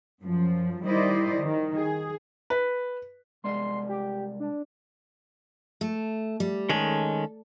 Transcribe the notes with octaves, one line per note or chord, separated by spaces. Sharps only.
F#2 F3
D#3 G3 E4 C5 D5 D#5
D#3
G#4
B4
C2 G#3 D5 C6
G4
D4
A3
G3
D#3 G#3 C#4 A4